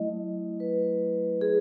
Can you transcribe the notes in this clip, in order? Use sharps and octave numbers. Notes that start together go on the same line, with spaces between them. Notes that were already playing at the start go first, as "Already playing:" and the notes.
Already playing: F#3 A3 E4 D#5
B4
G#4